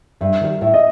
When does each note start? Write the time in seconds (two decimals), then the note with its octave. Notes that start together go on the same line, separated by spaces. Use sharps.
0.21 G2 E5
0.41 D#3 G3
0.61 A2 E5
0.74 D#5